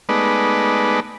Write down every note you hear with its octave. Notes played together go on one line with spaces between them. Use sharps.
G#3 A3 B3 D#4 B4 D5